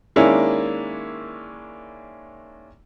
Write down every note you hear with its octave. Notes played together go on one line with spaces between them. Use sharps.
D#3 G#3 A#3 C#4 D4 E4